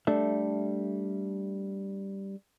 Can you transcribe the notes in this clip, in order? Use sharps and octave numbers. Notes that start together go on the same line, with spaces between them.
G3 A3 D4 A4 E5